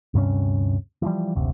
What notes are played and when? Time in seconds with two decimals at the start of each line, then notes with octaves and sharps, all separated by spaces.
0.14 D2 G2 C3 C#4
1.02 E3 F3 G3
1.35 F#1 D2 C3